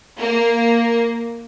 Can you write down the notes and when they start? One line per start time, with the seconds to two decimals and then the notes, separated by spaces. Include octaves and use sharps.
0.20 A#3